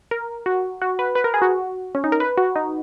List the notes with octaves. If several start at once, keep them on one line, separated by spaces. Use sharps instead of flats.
A#4
F#4
F#4
B4
B4
A#4
G#4
F#4
C#4
D#4
A#4
B4
F#4
D#4